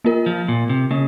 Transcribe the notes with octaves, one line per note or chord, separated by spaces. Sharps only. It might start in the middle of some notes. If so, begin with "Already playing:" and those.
A#3 F4 A#4
F3
A#2
C3
C#3 A#3